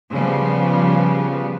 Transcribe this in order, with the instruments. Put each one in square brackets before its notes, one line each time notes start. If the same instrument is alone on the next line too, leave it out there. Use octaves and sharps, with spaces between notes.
[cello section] C#3 F3 G3 B3